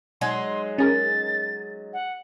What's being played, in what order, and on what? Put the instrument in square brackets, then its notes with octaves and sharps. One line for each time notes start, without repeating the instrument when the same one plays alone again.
[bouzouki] F#3 G#3 D#4 [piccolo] C6
[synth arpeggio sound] C#4 G#4 A#4 [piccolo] A6
[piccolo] F#5